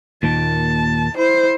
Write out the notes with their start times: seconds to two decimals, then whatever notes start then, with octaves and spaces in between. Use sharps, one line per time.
0.23 D#2 A#2 D#3 A5
1.14 E4 C5